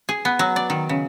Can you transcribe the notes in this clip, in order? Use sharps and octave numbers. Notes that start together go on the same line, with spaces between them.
G#4
B3
F#3
D5
D#3
C#3